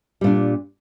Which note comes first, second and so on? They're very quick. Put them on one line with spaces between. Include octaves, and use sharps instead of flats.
G3 A#2 D4